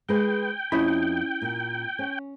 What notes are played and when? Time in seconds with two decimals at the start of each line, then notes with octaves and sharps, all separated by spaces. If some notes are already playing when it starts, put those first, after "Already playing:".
0.09 G#3 B4 G5
0.72 F2 C#4 E4 D#5 B5
1.41 A#2
1.99 C#4